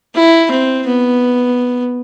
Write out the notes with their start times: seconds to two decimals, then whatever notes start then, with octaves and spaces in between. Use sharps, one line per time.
0.15 E4
0.51 C4
0.87 B3